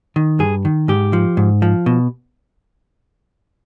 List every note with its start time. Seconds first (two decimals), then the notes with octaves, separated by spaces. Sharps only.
0.16 D#3
0.39 G2 G#4
0.65 D#3
0.88 G#2 G4
1.13 F3
1.37 G#2
1.62 F3
1.86 B2